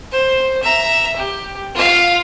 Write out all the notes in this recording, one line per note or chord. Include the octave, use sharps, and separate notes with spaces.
C5
E5 A#5
G4
F4 F5